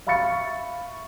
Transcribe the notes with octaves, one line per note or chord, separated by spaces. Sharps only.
E5 F5 B5 C#6 A6 C#7